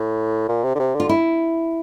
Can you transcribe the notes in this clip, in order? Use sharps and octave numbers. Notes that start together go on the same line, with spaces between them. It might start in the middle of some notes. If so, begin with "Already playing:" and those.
Already playing: A2
A#2
C3
D3
C3
D3 F4
E4